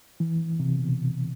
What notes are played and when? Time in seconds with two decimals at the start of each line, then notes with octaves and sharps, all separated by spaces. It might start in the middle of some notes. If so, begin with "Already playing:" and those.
0.20 E3
0.60 C3
0.79 B2